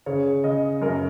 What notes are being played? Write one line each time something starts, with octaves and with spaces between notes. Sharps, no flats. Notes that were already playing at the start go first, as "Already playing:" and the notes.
C#3 C#5
C#3 D#5
F#2 A#4